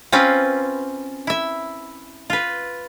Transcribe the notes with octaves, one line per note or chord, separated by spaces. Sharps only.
C4 C#4 F4 B4
E4 E5
F4 B4